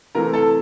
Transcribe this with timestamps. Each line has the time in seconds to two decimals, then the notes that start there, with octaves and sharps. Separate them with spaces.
0.15 C3 E3 A3 A#4 A#5
0.33 A4 A5